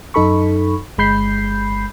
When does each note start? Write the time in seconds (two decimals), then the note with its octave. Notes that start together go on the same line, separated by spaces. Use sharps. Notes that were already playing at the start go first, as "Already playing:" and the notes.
0.14 F#2 D#4 A4 B5 C#6
0.98 G1 G#3 B5 G6 C7